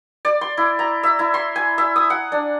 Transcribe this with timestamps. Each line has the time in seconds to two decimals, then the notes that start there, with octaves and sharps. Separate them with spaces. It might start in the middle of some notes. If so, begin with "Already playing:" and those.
0.25 D5
0.41 C6
0.57 E4
0.79 A#5
1.03 E5
1.19 E4
1.34 C6
1.56 G#5
1.78 E5
1.96 D#6
2.10 F#5
2.32 D4